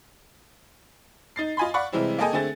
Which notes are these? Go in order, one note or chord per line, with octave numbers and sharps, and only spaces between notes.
D#4 A6 C7
F4 D#5 G#5 B5 C6
D5 F5 F#5 B5 C#6
C3 E3 G3 G#3 C4 E4
A#3 G#4 A4 D#5 G5 G#5
D3 A3 C4 G#4 A6